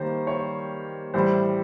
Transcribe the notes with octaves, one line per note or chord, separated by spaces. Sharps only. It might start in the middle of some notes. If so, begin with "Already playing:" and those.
Already playing: D#3 G3 A#3 C5
C#5
A2 E3 G3 C5